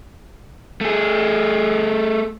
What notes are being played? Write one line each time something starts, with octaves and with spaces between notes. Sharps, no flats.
A3 G#4